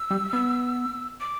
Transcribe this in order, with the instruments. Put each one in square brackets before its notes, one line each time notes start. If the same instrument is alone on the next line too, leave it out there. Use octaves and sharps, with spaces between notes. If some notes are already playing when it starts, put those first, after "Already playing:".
Already playing: [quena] E6
[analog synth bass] G3
B3
[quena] D6